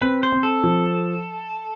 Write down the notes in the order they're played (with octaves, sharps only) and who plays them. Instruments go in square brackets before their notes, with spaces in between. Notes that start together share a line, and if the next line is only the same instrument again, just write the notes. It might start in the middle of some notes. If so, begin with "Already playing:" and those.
[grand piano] C4 [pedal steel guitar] B4
[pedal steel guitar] C5
[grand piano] C4
[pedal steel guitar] A4
[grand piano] F3